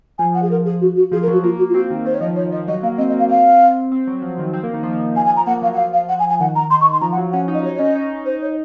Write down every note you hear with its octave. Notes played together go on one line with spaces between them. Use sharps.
F3 G#5
F#5
G#4
A#4
G#4
F#4
F#4
F3 G#4
A#4
F#3 F#4
A#3 F4
F#4
F4
C4 F#4
D#3
D#3 C5
C#5
F3 D#5
D#3 C#5
F3 D#5
F#3 D#5
A#3 F5
C4 D#5
D#5
A#3
F5
C4 F5
C4
F#3
F3
D#3
C4
A#3
D#3
F3
D#3
F3 G#5
G#5
A#5
A#3 F#5
F#3 F5
F#5
F3 F5
F5
F#5
G#5
G#5
D#3 F#5
A#5
D#3 C6
C#6
C6
F3 A#5
F#5
F#3
C#4 F#5
D#4
D#5
D#4 C#5
C#5
C#4 D#5
D#4
D#4 C5
C#5